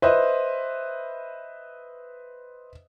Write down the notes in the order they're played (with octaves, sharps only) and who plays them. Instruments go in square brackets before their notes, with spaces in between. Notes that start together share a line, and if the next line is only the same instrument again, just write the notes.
[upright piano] B4 C5 D#5 E5